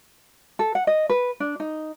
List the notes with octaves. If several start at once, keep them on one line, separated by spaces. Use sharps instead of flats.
A4
F#5
D#5
B4
D4
D#4